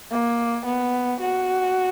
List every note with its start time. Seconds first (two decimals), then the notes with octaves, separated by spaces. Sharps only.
0.11 A#3
0.66 B3
1.21 F#4